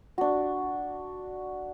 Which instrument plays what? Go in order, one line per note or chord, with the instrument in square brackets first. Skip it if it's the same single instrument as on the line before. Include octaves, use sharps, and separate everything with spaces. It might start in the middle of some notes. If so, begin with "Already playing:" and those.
[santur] D4 F#4